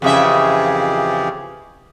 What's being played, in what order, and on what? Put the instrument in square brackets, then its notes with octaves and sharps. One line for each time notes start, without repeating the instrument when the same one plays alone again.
[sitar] F2 C#3 E5 [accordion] E3 G4 G#4